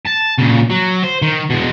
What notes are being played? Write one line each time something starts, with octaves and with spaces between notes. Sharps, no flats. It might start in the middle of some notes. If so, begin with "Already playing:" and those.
A5
A#2 C#3
F#3
C5
D#3
B2 G#3